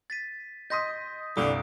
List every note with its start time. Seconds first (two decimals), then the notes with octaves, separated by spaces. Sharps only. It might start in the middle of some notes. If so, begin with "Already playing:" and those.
0.10 A6 B6 D#7
0.70 D#5 C6 D#6 G6 A#6 B6
1.37 C2 G2 D3 D#6 D7